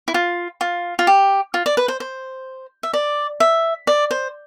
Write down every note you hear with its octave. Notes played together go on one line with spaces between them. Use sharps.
E4
F4
F4
F4
G4
F4
D5
B4
C5
C5
E5
D5
E5
D5
C5